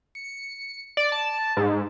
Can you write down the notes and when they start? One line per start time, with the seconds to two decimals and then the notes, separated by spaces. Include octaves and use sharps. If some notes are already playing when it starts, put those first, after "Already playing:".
0.15 C#7
0.97 D5
1.12 A5
1.57 G#2